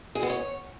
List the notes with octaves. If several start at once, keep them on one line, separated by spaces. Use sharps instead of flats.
G#4
B3
C#5